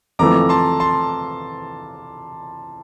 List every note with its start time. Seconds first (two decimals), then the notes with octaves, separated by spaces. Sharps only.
0.19 F2 E3 A3 A#5 D6
0.49 A5 C6
0.80 A5 C6